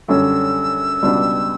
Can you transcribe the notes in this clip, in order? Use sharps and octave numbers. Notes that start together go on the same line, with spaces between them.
F#2 D3 G3 C#4 E6
C#2 B2 G3 D4